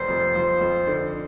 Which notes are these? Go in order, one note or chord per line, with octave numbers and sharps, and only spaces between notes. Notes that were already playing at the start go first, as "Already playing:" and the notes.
Already playing: F1 C5
F2
F3
F2
D3